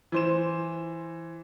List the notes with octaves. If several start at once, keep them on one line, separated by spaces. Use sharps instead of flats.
E3 C5 E7